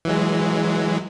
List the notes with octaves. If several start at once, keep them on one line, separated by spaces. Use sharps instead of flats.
E3 F#3 G#3